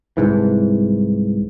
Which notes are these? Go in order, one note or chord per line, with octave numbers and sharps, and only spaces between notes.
C2 G#2 E3